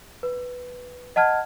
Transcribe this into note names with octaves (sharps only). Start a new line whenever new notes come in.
B4
D#5 F#5 A5 F6 G#6